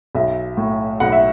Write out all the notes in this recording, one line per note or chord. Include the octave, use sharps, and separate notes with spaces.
B1 E5
A2
B1 F#5
E5